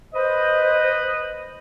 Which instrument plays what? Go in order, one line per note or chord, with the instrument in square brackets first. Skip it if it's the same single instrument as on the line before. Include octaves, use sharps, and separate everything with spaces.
[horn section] B4 D#5 [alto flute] C5